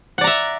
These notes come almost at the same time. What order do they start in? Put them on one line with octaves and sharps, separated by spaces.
F#5 D5 A#5 E5